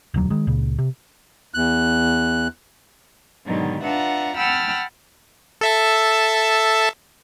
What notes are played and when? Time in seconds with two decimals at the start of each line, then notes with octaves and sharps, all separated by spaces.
0.14 E1 D2 F#3
0.30 D#3 G#3
0.47 C#2 A#2 C#3
0.79 C3
1.54 E2 F#6
3.46 G#2 B2 D3 D#3 F#3 G3
3.83 D4 F4 B4 E5 F#5 A#5
4.37 F#5 G5 A5 B5 E6 F6
5.61 A4 E5 A5